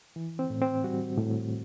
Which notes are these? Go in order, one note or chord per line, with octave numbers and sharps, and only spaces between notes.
E3
C4
A2
C4
G3 F#4
A2